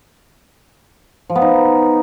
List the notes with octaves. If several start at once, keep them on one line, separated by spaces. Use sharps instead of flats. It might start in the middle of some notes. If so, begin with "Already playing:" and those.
F3
B3
D#4